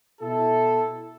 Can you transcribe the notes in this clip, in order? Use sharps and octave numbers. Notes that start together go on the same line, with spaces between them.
B2 E4 A4